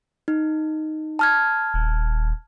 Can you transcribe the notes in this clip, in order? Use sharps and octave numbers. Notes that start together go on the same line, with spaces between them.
D#4
A5 F6 G#6
D#1